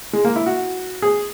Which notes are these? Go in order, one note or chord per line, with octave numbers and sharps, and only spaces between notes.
G#3
A#3
E4
F#4
G#4